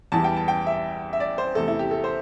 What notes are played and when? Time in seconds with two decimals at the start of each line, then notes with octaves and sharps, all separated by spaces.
0.12 E2 E3 G3 A5
0.24 G5
0.36 A5
0.48 G5
0.66 E5
1.13 E5
1.20 D5
1.38 C5
1.55 E2 C3 A3 A4
1.68 E4
1.79 G4
1.91 A4
2.04 C5